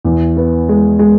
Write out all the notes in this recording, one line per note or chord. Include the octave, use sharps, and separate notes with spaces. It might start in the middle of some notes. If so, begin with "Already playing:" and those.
E2
B3
G#3
G#3